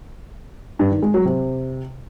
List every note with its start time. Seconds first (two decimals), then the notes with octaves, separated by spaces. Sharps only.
0.79 G2
0.91 D#3
1.02 G#3
1.14 F#3
1.25 C3